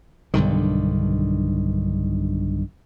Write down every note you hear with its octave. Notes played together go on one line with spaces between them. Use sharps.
B1 G2 D3 D#3